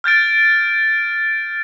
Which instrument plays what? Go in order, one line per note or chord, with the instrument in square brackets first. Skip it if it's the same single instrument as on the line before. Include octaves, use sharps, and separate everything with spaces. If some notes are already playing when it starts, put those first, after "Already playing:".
[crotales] F6 G6 A6 D7